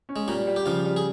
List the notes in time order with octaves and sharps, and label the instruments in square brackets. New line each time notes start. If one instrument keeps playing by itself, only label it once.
[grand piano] C#4
[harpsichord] G#3
[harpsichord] A#2 A#3 [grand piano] G3
[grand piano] G3
[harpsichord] G4
[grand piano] C#3 [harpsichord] F3 F4
[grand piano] G3
[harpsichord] G#4